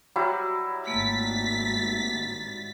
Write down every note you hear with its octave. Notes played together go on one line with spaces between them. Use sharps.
F#3 G3 E4
G#1 A3 A#3 A6 B6